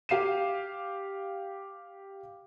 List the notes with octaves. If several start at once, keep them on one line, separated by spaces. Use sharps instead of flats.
G4 F5 C7 D#7 E7